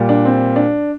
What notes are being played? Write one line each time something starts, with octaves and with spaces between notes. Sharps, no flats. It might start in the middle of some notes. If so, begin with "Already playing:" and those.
Already playing: A#2 G3
D4
C4
D4